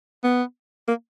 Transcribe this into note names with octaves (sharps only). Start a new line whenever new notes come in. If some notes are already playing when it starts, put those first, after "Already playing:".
B3
A#3